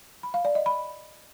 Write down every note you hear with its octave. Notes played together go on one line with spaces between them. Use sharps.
B5
F5
D5
D#5
B5